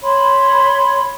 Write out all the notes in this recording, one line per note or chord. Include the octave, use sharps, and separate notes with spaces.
C#5 B5 C6